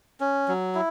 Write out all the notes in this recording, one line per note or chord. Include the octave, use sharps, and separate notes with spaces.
C#4
F#3
E4